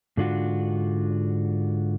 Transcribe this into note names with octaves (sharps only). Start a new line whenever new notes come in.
G#2 D3 D4 F4 F#4